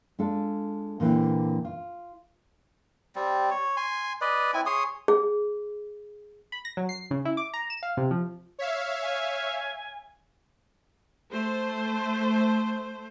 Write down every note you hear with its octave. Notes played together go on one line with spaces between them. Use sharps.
G#3 D4 F4 A4
A#2 D3 E3 A#3 C4
F4
G3 C4
C#5
G#5 C6
B4 D5 D#5
C4 E4 G#5
G#4 C#5 C6 D#6
G#4
B5
A#6
F#3
C7
C#3
E4
D6
A#5
E7
F5
C3
F3
C#5 E5 F5
G#5
A3 C5